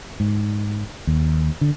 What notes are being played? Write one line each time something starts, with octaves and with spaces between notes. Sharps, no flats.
G#2
D#2
D3